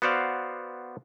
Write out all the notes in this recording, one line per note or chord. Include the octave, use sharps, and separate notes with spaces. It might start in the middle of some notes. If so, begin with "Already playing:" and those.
B3 F#4 C5 D5 F5